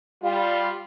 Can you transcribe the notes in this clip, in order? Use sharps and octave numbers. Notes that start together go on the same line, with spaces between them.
G3 F4